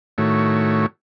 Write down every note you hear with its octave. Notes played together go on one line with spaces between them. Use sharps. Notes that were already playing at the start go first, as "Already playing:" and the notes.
A2 D#3 A3 F#4 C#5